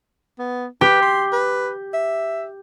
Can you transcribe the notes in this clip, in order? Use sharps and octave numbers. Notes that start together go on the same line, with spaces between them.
B3
G4 B4
C6
B4
E5